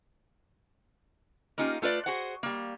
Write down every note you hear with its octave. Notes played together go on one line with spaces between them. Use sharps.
A#3 C#4 D#4 F4 G4
A3 F4 B4 D5
F#4 G#4 C5 F#5
G3 A#3